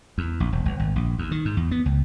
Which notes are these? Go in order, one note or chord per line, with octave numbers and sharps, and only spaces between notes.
E2
A#1
E1
G1
G#1
A#1
D#2
D#3
G#2
E2
B3
C#2